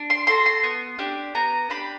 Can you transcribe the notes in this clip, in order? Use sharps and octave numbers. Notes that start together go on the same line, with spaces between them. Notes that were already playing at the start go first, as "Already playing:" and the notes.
Already playing: D4
C6
F#4 A4 C6
C6
B3
D4 G4
B3 A#5
D4 G4 B5